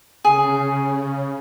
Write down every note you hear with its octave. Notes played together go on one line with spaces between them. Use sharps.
C#3 G#4